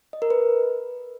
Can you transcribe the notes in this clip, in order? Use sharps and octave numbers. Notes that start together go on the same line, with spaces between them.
D#5
A#4
B4